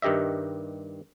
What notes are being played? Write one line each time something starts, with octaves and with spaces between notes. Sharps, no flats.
G2 D#3 G4 D#5 E5